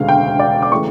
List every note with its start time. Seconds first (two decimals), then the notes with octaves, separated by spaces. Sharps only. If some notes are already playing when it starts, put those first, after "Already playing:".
Already playing: E1 D2 C#3 F5
0.09 G5
0.40 D5
0.62 D6
0.72 C#3 E3 A3 C#6